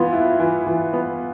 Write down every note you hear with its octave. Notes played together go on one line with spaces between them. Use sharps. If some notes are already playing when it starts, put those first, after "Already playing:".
Already playing: E3 B3 F4
E4
E3
E3
B3